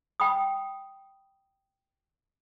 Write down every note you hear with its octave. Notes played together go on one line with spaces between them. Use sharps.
G5 B5 D#6